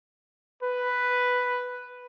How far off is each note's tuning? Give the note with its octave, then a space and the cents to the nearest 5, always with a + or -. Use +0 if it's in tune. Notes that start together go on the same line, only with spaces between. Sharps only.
B4 +5